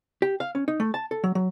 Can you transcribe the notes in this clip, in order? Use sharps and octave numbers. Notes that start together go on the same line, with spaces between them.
G4
F5
C#4
D#4
A3
A5
A4
F#3
F#3